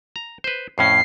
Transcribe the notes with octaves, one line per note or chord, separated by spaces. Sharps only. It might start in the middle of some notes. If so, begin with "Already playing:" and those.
A#5
B4 C5
F2 A2 C#4 C7